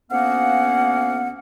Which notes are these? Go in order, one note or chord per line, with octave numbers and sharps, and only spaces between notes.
D2 A#3 B3 C#4 F5 F#5